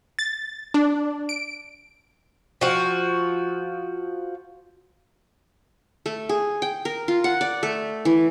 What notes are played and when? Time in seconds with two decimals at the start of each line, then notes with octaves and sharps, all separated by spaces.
0.19 A6
0.74 D4
1.29 D7
2.61 F3 F#4
6.06 A3
6.29 G#4
6.62 G5
6.85 A#4
7.08 F4
7.24 F#5
7.41 D5
7.63 A3
8.05 E3